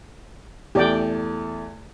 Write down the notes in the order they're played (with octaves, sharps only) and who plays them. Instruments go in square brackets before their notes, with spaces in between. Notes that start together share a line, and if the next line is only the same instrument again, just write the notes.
[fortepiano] E2 A3 [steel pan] G4 D5 G5